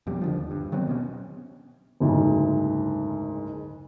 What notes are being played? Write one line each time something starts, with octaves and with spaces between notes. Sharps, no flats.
F2 B2 G3
D#1 D3 F3
D#2
G2
D#3 F#3 B3 C4
B2 B3 C#4
F#1 D2 G#2